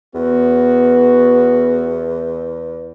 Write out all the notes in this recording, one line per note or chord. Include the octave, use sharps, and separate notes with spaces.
E2 B3 F#4